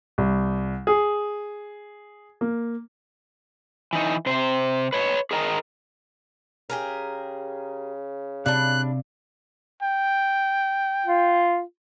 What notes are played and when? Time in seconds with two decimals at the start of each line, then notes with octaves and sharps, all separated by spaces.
0.18 C2
0.87 G#4
2.41 A#3
3.93 E3 D#4
4.26 C3 C5
4.93 B4 C#5
5.31 G#4 A#4 D#5 G#5 A#5
6.70 C#3 G4 G#4 A#4
8.46 C3 G3 D4 D5 F5 F#6
9.83 G5
11.06 F4